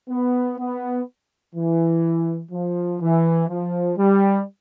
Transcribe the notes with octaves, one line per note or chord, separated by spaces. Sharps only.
B3
B3
E3
F3
E3
F3
G3